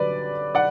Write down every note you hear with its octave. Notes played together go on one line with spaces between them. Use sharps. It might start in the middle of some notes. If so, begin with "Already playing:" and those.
Already playing: F#2 D3 G3 B4 D5
D5 F#5